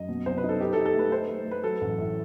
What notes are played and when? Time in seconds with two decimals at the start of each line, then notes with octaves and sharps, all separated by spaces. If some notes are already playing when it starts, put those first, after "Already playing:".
Already playing: F#2 D#5
0.09 B2
0.26 C2 C5
0.38 B4
0.43 D#4
0.49 A4
0.60 D#4 G4
0.73 A4
0.77 D#4
0.86 A4
0.94 A3 B4
1.11 D#4 C5
1.28 A3
1.45 A3
1.51 B4
1.63 F#3 A4
1.81 A1
1.98 A2